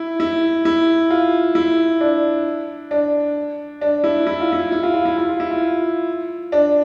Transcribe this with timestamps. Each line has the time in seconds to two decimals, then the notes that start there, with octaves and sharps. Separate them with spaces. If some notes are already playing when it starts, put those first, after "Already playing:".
Already playing: E4
0.20 E4
0.65 E4
1.10 F4
1.55 E4
2.01 D4
2.91 D4
3.81 D4
4.04 E4
4.27 E4
4.40 F4
4.53 E4
4.72 E4
4.83 F4
4.94 F4
5.05 E4
5.18 F4
5.29 F4
5.40 E4
5.51 F4
6.52 D4